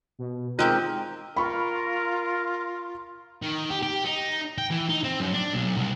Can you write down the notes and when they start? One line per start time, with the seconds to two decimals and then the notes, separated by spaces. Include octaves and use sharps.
0.19 B2
0.59 G#3 C4 D#4 F4 G4 A#4
1.37 F4 A#4 B5 C#6
3.42 D#3
3.70 G4
3.83 G4
4.05 D#4
4.58 G5
4.71 E3
4.89 D#4
5.04 C4
5.20 F#2
5.34 D4
5.53 B1
5.77 C2